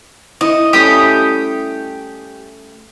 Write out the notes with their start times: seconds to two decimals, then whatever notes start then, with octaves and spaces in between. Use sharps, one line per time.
0.41 E4 D#5 C#6
0.73 G3 A3 C#4 G4 G5 D#6